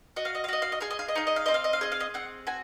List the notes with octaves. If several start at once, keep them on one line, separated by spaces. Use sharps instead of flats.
F#4 D#5
F5
D#5
F5
F#4 D#5
F5
D#5
G#4 F5
D#5
F5
D#5
D#4 F5
D#5
F5
C4 D#5
F5
D#5
F5
G#4 D#5
F5
D#5
C4 F#5
F#4 G#5